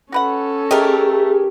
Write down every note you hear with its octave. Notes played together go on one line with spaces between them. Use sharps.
C#4 F#4 A4 B4 F#5
A3 G4 G#4 A#4 D#5